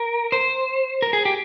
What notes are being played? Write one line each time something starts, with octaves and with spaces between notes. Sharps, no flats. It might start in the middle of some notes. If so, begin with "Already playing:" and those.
Already playing: A#4
C5
A#4
G#4
G4